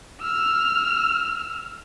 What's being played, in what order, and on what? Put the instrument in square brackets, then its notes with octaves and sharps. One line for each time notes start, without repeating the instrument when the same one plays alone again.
[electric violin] E6 F6